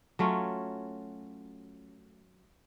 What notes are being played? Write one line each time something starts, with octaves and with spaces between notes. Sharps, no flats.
F#3 A3 C#4 F4